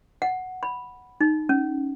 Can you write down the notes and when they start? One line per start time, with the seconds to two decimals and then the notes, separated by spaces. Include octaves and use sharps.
0.22 F#5
0.63 B5
1.21 D#4
1.49 C#4